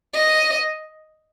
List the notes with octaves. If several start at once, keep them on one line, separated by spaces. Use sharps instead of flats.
D#5